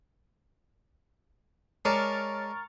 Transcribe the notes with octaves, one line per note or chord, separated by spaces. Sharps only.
G#3 A#4 C#5 D5 A5 C#6 F6 A6